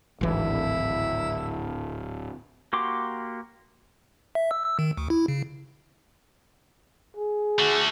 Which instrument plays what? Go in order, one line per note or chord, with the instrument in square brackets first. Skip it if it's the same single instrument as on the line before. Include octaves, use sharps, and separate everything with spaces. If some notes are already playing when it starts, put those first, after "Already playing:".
[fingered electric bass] D1 [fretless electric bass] G#1 E3 [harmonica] E4
[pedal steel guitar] A#3 F#4 G4 C6 D6
[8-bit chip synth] E5
E6
E6
D#3
D2
E4
C#3
[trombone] G#4
[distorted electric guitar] A3 F#4